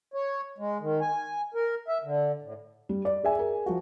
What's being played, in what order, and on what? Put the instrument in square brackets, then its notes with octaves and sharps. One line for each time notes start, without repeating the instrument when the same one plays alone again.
[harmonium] C#5
G#3
D#3
G#5
A#4
E5
D3
A2
[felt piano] G3
D5
[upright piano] G#4 E5 G#5
[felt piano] A#4
[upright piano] F3 F#4